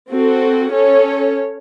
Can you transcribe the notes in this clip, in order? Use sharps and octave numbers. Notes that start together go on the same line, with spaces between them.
C4 F#4 A4
C#4 A4 C#5